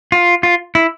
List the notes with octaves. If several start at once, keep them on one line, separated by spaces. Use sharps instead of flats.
F4
F4
E4